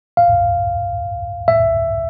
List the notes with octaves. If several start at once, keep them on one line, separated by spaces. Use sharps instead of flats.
F5
E5